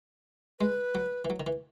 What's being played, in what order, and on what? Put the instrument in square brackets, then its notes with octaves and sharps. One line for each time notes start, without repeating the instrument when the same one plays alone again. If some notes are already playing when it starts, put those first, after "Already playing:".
[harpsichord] G#3 [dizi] B4
[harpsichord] F#3
E3
F#3
D#3
E3